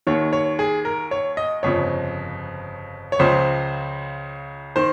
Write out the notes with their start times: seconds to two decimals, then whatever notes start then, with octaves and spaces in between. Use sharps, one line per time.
0.07 D#2 D#3 C#5
0.33 C#5
0.59 G#4
0.85 A#4
1.11 C#5
1.37 D#5
1.63 G1 F2 C#3 F3 C#5
3.12 C#5
3.19 C#2 C#3 F3 C5
4.76 D#3 C5